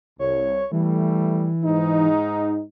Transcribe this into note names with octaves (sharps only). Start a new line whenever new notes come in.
C2 C#5
E3 G3 A3
G#2 D#4